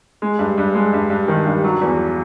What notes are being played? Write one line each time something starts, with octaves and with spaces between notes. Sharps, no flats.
G#3
G2
G2
G#3
G2
G2
D#3
G2
F#3
E2